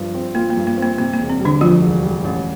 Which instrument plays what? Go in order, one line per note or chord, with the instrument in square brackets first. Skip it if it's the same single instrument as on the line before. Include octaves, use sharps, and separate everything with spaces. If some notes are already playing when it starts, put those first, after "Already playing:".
Already playing: [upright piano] G2 F3
C4
[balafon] A#3 [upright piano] F4
[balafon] A#3
[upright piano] G2
[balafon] A#3
[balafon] A#3 [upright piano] C4
[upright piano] C3 [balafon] A#3
[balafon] A#3
[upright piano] E1
[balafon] C4
[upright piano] G3
[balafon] D3 D4
[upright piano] D2 [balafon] F3 F4
[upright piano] E1
G3
A1